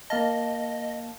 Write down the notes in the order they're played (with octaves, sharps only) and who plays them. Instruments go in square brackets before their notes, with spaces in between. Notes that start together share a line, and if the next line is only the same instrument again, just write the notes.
[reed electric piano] A#3 F5 A5 [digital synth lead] D#5